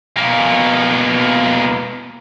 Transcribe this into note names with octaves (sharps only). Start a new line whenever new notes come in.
B2 A#3